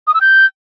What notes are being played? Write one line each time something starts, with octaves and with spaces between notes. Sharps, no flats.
D#6
E6
G6